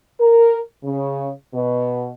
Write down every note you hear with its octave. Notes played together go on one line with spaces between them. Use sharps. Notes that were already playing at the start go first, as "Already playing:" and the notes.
A#4
C#3
B2